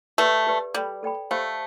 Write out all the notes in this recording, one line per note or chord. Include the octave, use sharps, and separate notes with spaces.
A3 G4 B4 D5
G4 B4 D5
G3 A4 D5 G5 B5
A4 D5 G5 B5
A3 G4 C5 F5 B5